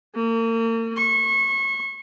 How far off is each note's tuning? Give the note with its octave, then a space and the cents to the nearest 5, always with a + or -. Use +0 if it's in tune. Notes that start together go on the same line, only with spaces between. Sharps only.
A#3 -40
C#6 -30